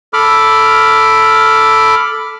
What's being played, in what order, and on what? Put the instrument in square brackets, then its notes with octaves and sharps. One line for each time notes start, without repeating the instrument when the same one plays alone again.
[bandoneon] A4 B5 D6 F6